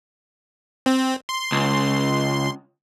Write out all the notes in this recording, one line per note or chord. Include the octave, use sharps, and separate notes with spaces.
C4
C6
C#2